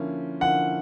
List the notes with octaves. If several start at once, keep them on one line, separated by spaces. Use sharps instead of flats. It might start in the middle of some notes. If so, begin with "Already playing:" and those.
Already playing: D3 F3 A#3 C#4 E4
D3 F3 A#3 C#4 E4 F#5